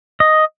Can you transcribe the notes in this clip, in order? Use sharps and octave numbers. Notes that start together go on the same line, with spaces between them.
D#5